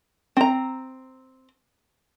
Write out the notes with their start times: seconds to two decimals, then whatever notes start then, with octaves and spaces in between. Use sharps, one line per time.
0.37 C4 A#5